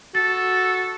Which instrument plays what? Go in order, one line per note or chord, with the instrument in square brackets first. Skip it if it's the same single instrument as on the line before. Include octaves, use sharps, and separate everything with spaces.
[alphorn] F#4 [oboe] A4 [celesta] A6